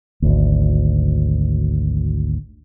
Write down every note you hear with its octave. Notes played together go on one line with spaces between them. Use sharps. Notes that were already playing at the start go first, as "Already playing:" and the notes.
G#1 D2